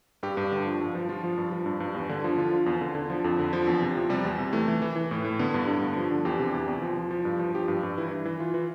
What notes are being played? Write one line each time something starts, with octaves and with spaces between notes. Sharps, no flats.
G2 G4
G2
D3
F3
G2
F3
F3 F4
F3
G2
F3
G2
G2
E2
D3
F3
D3 F4
F3
E2
D3
D3
F3
F2
D3
F3
E2
C3
F3
C3 G3
E2
C3
E3 A3
E3
E3
E3
A2
A2
D3 B3
G2
G2
D3
F3
D3
E2 G4
C3
E2
E2
F3
F3
F3
G2
F3
F3 G4
G2
G2
E3 E4
E3
E3
E3 F4
E3